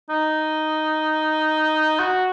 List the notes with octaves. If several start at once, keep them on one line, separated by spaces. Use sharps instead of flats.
D#4
F#4